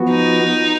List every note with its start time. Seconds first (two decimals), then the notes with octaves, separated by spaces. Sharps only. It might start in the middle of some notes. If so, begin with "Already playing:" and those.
Already playing: F3 B3 F#4
0.10 D#4